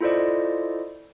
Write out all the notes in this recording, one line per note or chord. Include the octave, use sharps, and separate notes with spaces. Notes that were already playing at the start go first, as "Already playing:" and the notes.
E4 F4 A4 C5 D5 D#5